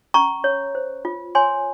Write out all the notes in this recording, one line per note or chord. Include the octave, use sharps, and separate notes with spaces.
C#4 A#5 C#6
C#5
C5
F4
C#5 G#5 C6